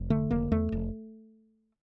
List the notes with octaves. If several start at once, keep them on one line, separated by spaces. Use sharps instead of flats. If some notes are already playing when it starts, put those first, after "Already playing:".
Already playing: F1
D3 A3
F1 A#3
E2 A3
F1